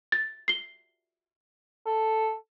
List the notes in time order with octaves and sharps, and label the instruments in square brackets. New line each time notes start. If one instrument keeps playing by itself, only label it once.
[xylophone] A6
C7 G7
[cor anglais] A4